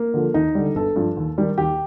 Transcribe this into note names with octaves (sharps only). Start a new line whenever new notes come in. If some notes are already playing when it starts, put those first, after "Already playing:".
Already playing: A#3
D3 F3
D#2 D#4
D3 G3
G1 A4
G2 F3
D#2
D#3 G3
D#2 G4